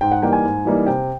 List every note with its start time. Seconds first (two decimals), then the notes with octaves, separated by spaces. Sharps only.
0.01 G#2 G5
0.12 F#5
0.22 E3 G3 A#3 D#4 G5
0.33 G#5
0.44 G#2
0.65 E3 G3 A#3 D#4
0.86 C3 G5